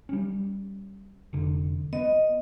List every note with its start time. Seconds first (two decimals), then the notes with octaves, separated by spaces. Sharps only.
0.09 G3 C#4
1.33 F1 D3
1.93 B3 D#5